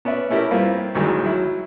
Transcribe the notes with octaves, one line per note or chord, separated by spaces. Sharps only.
B3 C#4 D5 E5
A3 C#4 E4 G4 A#4
G2 A#3 C4 E4 F4
A1 D2 A2 D#3 F#3 G#3
F#3 E4